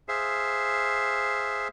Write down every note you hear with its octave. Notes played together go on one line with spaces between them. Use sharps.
G#4 C5 E5 F5